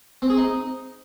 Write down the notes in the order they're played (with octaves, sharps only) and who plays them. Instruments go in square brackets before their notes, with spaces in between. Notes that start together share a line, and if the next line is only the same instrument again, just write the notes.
[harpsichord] C4
G#4
D#4